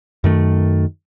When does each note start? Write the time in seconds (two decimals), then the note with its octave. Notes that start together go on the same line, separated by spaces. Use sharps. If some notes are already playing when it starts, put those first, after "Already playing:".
0.24 F#2 D#3 A3